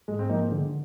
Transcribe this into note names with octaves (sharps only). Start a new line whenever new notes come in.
G#2 G#3
C4
F3 A#3 D#4
C4
D3 G#3